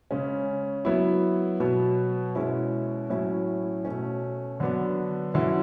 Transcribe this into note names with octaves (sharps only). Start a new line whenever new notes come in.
C#3 G#3 C#4
F#3 B3 E4
B2 F#3 B3
B2 G#3 C#4 E4
A2 F#3 C#4 E4
B2 A3 C#4
D3 F#3 B3 D4
D3 F#3 C#4 E4